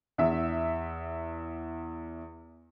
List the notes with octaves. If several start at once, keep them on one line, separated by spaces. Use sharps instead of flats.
E2 E5